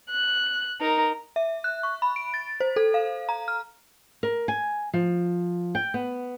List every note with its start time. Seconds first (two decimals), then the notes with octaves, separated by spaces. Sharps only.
0.10 F#6
0.81 D#4 A#4
1.36 E5
1.64 F#6
1.83 C#6
2.02 B5
2.16 D7
2.34 A6
2.60 C5
2.76 A4
2.94 F5
3.29 A#5
3.48 F6
4.23 A#4
4.48 G#5
4.94 F3
5.75 G5
5.94 B3